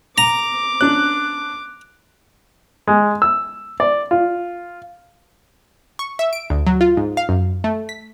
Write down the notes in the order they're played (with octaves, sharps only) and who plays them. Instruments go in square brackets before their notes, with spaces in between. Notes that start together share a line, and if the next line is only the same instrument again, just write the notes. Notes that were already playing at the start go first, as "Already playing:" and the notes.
[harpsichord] A#5 [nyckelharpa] D6
[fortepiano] C#4 D4 [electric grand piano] F#6
[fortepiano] G#3
E6
D5
F4
[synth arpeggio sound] C#6
E5
D7
D2
F#3
F4
G#2
F5
F#2
A3
B6